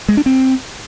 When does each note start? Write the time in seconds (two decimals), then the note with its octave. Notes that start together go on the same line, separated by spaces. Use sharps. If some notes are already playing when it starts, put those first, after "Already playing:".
0.09 G#3
0.17 D4
0.26 C4